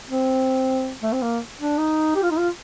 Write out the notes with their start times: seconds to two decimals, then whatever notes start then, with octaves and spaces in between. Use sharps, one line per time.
0.09 C4
1.03 A3
1.12 C4
1.22 A#3
1.59 D4
1.78 D#4
2.15 G4
2.23 F4
2.31 D#4
2.39 F4